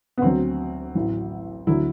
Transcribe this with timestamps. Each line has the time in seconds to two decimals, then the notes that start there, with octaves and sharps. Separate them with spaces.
0.18 B3
0.22 D2 D3 F#3 C4
0.95 A1 A2 F#3
1.67 D2 D3 F#3 E4